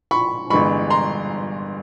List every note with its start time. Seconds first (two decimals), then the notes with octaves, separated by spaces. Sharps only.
0.11 B5 C#6
0.50 G1 G2 E3 G#3 B5 C#6
0.90 A#5 C6